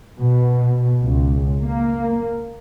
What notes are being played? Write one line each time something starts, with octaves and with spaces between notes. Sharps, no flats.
B2
C#2
A#3